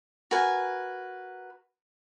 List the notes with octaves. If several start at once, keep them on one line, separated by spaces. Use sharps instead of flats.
F#4 A#4 B4 G#5